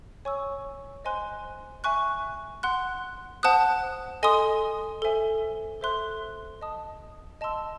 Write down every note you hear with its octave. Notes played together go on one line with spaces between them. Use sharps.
C#5 G#5 C#6 E6
C5 D#5 G#5 C6 F#6
E5 G#5 C#6 F#6
F#5 C6 F#6
C5 F#5 A5 D#6 F#6
A4 D#5 G#5 C6 D#6
A4 C5 E5 G#5
A4 C5 E5 C6 F#6
D#5 A5 D#6
D#5 A5 C6 E6